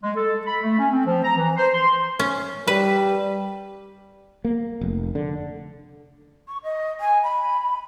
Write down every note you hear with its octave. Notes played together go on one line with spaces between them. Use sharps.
G#3
A4
B5
A3
C#4
C4
F3
A#5
E3
C5
C6
C#4
G3 B4
A#3
F1
D3
C#6
D#5
G#5
B5